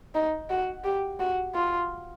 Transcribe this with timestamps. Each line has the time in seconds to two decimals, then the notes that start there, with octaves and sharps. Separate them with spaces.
0.15 D#4
0.50 F#4
0.84 G4
1.19 F#4
1.54 F4